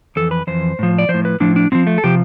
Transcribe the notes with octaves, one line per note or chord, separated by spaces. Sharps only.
F2 E3 A4
B4
F2 E3 C5
A2 F3
D5
F3 C5
A2
B4
A2 F3 D4
D4
A2 F3 C4
A3
A4
C3 F3 G4